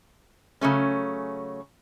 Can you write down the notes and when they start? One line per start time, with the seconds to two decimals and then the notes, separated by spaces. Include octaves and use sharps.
0.61 C#3 F#3 A3 C#4